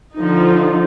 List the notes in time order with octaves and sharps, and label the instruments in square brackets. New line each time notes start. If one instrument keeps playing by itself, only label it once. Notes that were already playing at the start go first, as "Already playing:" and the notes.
[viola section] D3 F3 D#4